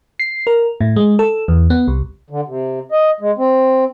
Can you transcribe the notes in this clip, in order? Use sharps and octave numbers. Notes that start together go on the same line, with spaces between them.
C7
A#4
A2
G#3
A4
E2
B3
C2
D3
C3
D#5
G#3
C4